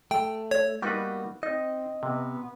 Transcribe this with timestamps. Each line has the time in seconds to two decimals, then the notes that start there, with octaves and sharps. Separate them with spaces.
0.11 A3 G5
0.51 C#5
0.82 G3 A#3 B3 D#4 F#4 B4
1.43 C4 D#4 D#5
2.03 C3 B3